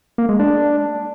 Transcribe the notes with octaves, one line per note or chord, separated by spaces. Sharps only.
A#3
G#3
D4